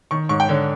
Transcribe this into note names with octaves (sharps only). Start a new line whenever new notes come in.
D#3 C#6
G#2 C#6
G5
D3 C#5